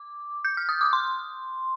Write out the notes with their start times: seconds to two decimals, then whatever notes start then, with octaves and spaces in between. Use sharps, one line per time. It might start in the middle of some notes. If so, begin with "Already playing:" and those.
Already playing: D6
0.45 G6
0.57 F6
0.69 D#6
0.81 D6
0.93 C6